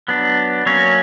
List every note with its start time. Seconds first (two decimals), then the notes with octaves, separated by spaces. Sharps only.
0.08 F#3 B3 D4
0.66 F#3 A#3 C#4 C#5